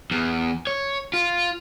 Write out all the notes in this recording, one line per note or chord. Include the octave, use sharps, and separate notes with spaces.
E2
C#5
F4